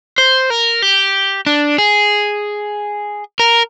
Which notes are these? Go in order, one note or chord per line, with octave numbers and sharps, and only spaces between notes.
C5
A#4
G4
D4
G#4
A#4